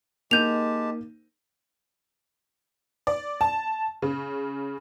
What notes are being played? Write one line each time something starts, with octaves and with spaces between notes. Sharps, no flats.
G#3 A#3 D#4 G4 A5 G6 D#7 F7
D5
A5
C#3